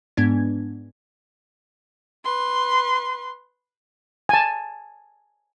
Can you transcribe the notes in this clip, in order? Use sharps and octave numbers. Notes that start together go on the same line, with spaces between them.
G#2 G#3 B3 D4 G#6
B4 C6
G#5 A5